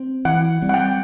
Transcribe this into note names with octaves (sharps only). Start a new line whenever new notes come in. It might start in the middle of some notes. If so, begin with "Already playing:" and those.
Already playing: C4
E3 F#5
G3 C4
F#5
G5